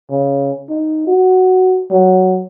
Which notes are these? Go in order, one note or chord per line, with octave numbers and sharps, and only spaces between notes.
C#3
D#4
F#4
F#3